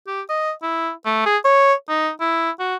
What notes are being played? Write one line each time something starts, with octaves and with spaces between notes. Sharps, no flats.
G4
D#5
E4
A3
G#4
C#5
D#4
E4
F#4